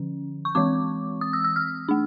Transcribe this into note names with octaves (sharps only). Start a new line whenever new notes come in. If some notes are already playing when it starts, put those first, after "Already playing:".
Already playing: D3 F3 C#4
C#6
E3 G#3 C4 D6
D#6
E6
E6
F6
A3 D4